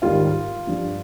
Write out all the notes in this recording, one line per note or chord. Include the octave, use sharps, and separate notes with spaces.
G#2 D#3 G3 F4 F5
G2 F3